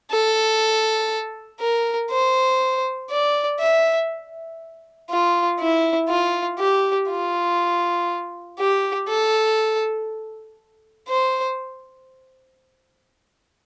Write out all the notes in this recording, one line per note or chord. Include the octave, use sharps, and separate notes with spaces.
A4
A#4
C5
D5
E5
F4
E4
F4
G4
F4
G4
A4
C5